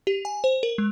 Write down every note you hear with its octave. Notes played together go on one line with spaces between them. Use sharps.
G4
G#5
C5
A#4
G#3